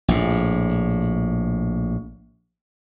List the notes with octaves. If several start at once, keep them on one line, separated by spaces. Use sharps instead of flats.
A#1 A2